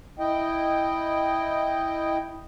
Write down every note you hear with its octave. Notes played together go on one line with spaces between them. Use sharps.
E4 D#5 G5